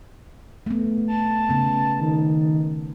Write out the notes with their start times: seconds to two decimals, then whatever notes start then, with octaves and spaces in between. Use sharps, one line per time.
0.66 A3 B3
1.08 A5
1.50 C#3 B3
2.00 D#3